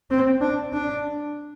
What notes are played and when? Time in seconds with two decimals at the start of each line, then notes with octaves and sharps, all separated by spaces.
0.11 C4
0.41 D4
0.73 D4